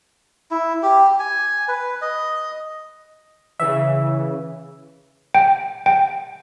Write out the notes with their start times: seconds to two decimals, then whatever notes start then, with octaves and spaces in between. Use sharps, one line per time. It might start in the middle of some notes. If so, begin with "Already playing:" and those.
0.51 E4
0.83 G4
1.19 G#5
1.68 B4
2.02 D#5
3.60 C#3 E3 E5
5.35 G5
5.86 G5